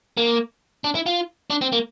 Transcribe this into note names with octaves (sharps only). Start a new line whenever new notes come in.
A#3
D4
E4
F4
D4
C4
A#3